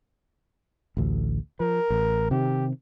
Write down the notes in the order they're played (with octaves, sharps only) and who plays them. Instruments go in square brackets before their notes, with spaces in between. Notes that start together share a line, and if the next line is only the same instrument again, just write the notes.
[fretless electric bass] A1 D2
[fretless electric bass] F3 [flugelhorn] A#4
[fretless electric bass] A1
[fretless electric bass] C3 D#3 [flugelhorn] G4